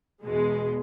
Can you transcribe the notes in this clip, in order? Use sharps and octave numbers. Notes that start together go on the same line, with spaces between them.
E2 B2 G#3